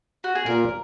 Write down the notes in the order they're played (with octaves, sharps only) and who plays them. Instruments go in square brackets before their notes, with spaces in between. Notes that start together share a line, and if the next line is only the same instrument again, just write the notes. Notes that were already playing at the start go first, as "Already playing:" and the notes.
[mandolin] F#4
G#4
[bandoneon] A#2 [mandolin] A#4